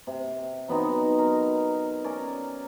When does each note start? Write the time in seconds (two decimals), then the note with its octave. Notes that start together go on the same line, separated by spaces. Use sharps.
0.07 C3
0.68 F#3 B3 C4 D#4
1.19 A#4
2.04 C#4 A#4 D5